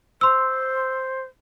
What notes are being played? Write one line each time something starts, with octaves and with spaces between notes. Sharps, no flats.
C5 C6 E6